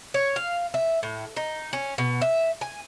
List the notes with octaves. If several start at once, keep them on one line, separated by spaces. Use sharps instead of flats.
C#5
F5
E5
A2
D#4
C#4
B2
E5
G#5